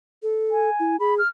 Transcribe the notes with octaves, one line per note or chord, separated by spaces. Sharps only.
A4
G#5
E4
G#4 B5
F6